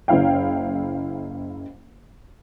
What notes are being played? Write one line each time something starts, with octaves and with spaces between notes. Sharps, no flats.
F#1 F#2 E4 F5 G5